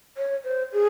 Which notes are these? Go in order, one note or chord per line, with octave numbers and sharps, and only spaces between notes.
C#5
C5
G#4